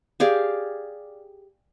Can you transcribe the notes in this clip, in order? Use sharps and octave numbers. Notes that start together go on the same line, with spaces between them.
G4 G#4 D5 F5